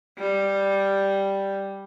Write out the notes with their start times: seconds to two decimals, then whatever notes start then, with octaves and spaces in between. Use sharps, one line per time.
0.18 G3